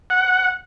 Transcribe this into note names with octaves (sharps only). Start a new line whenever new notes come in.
F#5